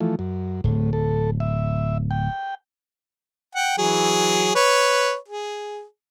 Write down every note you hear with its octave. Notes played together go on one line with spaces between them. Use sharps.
E3 F3 A3
F#2
D1 A2
A4
E5
G5
F#5 G5
E3 F#3 G#4
B4 C#5
G#4